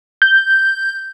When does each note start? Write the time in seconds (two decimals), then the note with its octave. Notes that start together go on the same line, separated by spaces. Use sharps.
0.22 G6